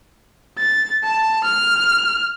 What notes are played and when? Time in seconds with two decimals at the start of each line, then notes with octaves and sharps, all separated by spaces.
0.58 A6
1.04 A5
1.45 F6